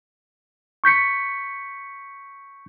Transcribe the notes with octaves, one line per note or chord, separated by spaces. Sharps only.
C#6 G6 B6 C#7